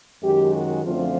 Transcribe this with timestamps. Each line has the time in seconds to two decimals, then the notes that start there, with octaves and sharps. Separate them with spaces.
0.23 F#2 D#3 G#3 G4
0.54 F#4
0.85 F#2 D3 F3 A3 C4 F4